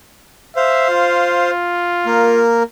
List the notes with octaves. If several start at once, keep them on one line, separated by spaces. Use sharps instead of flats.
C5 E5 F5
F4
A#3 A#4